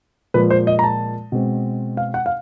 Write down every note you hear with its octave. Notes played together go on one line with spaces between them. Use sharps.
A#2 F3 G#3 B4
C5
D#5
A#5
A5
B2 G#3 C4
F5
F#5
F5